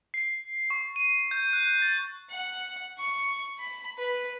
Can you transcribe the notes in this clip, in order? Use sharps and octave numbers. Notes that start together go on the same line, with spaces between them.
C7
C#6
D#7
G6
F#6
A6
F#5
C#6
B5
B4